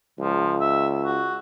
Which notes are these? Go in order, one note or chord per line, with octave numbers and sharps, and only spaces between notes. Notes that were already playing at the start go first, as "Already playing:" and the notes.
C#2 F3
E5
F#4